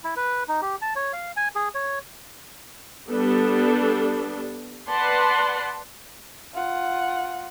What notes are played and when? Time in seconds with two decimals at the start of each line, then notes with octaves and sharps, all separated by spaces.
0.04 E4
0.16 B4
0.48 D#4
0.62 G4
0.82 A5
0.95 C#5
1.13 F5
1.36 G#5
1.55 G#4
1.74 C#5
3.10 G3 B3 D4 A4
4.89 B4 D5 F#5 A5 C6
6.54 F4 F#5